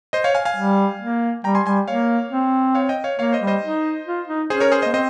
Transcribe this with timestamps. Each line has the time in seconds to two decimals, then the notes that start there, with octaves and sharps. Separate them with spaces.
0.13 C5 D#5
0.24 C#5 F5
0.34 F5 G#5
0.45 F5 G#5
0.57 G3
1.01 A#3
1.44 G3 G5 A#5
1.55 G#5 C6
1.65 G3 G#5 C6
1.88 A#3 C#5 F5
2.32 C4
2.75 C#5 F5
2.89 D#5 G5
3.04 C#5 F5
3.19 A#3 C#5 F5
3.33 C5 D#5
3.41 G3
3.47 C5 D#5
3.63 D#4
4.06 F4
4.28 D#4
4.50 C#4 G#4 C5
4.60 A#4 C#5
4.72 G#4 C5
4.82 C5 D#5
4.86 A#3
4.93 C4 C5 D#5